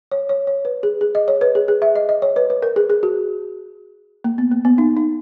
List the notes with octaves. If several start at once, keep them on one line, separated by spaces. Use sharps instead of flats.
C#5
C#5
C#5
B4
G#4
G#4
D#5
C#5
B4
G#4
G#4
E5
D#5
D#5
C#5
B4
B4
A#4
G#4
G#4
F#4
A#3
B3
A#3
B3
D#4
D#4